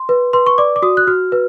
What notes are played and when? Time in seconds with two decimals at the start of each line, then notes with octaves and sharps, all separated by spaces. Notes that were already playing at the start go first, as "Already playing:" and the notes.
Already playing: C6
0.09 B4
0.33 B4 C6
0.46 C#6
0.58 D5 D6
0.76 D6
0.82 F#4 D#6
0.97 F#6
1.07 F#4 F6
1.32 B4